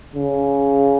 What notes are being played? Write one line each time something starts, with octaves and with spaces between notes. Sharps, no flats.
C#3